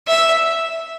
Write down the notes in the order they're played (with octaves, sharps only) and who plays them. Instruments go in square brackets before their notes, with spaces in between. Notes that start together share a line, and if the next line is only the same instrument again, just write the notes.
[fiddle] E5